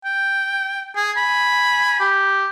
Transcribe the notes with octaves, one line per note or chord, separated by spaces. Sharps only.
G5
G#4 G#5
B5
G4